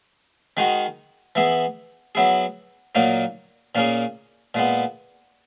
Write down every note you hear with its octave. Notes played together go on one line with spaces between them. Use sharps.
D#3 G#3 D#4 F#4
E3 B3 E4 G#4
F#3 B3 E4 G#4
A#2 F#3 A#3 D#4
A#2 A#3 C#4 G#4
A#2 G#3 B3